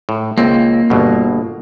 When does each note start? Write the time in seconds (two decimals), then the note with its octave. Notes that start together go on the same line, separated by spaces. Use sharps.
0.09 A2
0.38 C#2 A#3 C4
0.90 G1 B2